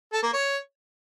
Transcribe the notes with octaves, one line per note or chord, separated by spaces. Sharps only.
A4
A#3
C#5